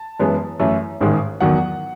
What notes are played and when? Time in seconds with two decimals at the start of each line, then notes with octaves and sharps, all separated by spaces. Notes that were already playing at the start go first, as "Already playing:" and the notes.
Already playing: A5
0.20 F#2 E3 G#3 B3
0.59 F#2 E3 A3
1.01 A1 G#2 D#3 G#3
1.40 E2 D#3 F#3 F#5